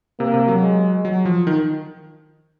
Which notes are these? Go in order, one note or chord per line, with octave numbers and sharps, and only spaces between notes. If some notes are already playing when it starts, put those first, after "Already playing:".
C3 A#3
C3
F#3
G#3
F#3
F3
D#3